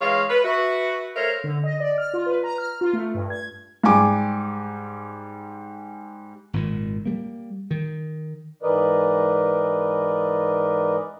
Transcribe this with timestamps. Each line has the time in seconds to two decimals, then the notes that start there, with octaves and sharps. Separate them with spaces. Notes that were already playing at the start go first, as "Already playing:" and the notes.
0.01 E3 G#3 C#5 F5
0.29 B4
0.44 F#4 B4 E5
1.16 A3 A#4 C5 C#5 E5 F5
1.44 D3
1.64 D#5
1.80 D5
1.98 F6
2.14 F4
2.26 B4
2.44 A#5
2.58 F6
2.81 F4
2.93 A3
3.14 G2
3.30 G#6
3.84 G#2 G3 G#5 D6
6.53 G#1 G2 A#2 D#3
7.06 G3 A#3
7.71 D#3
8.62 G#2 E3 A#4 B4 D5 D#5